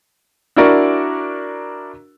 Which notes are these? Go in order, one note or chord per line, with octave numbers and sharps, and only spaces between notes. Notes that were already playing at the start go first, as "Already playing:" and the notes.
D4 E4 F#4 A#4 D5 C#6